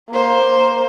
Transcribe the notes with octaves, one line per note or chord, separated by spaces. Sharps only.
A#3 C5